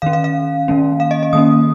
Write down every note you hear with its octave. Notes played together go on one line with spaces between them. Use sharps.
D#3 C#4 F5
F5
F5
D#3 A#3 C#4
F5
D#5
D#5
D#3 A#3 C#4 D#6